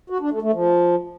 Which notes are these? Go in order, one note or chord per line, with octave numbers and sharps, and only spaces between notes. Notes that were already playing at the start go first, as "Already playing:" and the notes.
F#4
D4
A3
A3
F3